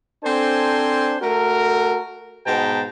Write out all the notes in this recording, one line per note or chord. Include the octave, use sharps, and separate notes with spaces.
C4 D4 A4 C5 G#5 C6
A3 F#4 A4 A#4
G#2 B2 B3 G5 A5 A#5